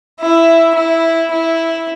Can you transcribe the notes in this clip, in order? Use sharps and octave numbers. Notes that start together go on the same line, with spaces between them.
E4
E4
E4